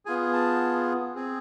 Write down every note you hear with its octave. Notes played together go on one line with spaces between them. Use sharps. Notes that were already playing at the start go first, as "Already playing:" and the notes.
B3 F4 G#4 G#5
A5
C4 G#4